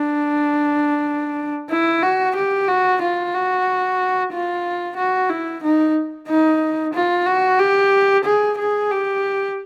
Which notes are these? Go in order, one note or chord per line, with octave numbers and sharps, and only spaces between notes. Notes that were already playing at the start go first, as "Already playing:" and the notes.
Already playing: D4
E4
F#4
G4
F#4
F4
F#4
F4
F#4
E4
D#4
D#4
F4
F#4
G4
G#4
G#4
G4